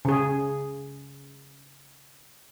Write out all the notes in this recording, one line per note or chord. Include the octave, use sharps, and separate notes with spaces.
C#3 G#4